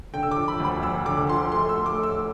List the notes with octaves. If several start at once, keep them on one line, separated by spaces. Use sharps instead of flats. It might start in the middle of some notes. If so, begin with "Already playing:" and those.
D3 G5
E6
D6
F3
B5
D2
B5
D2 E6
D3 D6
F3 C6
A3 C6
E6
A3
D6
A3
E6